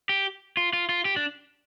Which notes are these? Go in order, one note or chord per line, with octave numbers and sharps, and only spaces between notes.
G4
F4
F4
F4
G4
D4